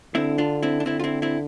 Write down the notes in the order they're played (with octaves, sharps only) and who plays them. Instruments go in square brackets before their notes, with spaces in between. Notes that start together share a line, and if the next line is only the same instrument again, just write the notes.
[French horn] D3 [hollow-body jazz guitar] C4 E4
[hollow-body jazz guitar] D4 F4
C4 E4
D4
[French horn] D3 [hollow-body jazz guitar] C4 E4
[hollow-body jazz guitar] F4
C4 E4
C4 E4